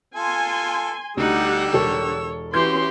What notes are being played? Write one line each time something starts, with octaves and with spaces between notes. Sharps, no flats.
F4 A4 G#5 C6
D2 D3 G3 D#4 G4 F#5 E6
E1 A4 A#4 C#5
E3 C#4 F#4 G4 C6 G6